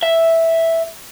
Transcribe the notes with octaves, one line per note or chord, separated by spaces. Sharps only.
E5